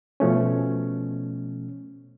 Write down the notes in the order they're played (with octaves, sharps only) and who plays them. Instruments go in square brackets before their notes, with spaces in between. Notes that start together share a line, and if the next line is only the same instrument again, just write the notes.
[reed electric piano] B2 F3 A3 C#4